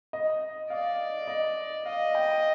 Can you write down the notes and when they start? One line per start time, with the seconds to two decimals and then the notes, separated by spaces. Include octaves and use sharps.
0.13 D#5
0.70 D5 F5
1.28 D#5
1.85 D#5 F5
2.15 G5